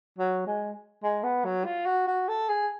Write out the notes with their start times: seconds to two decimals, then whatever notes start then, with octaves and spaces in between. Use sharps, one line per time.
0.18 F#3
0.47 G#3
1.03 G#3
1.24 B3
1.45 F#3
1.65 F4
1.86 F#4
2.07 F#4
2.28 A4
2.49 G#4